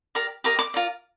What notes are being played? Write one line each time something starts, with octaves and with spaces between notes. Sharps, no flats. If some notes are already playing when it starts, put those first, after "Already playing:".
G4 A#4 D5
G4 A#4 D#5 D6
D6
F4 A#4 D5